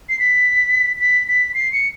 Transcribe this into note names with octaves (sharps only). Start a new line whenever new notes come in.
C7
B6
B6
B6
C7
C#7